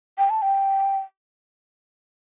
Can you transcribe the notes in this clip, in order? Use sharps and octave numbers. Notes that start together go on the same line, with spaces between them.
G5
A5
G5